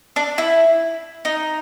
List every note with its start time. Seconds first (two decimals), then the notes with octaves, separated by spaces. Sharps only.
0.16 D4
0.38 E4
1.25 D#4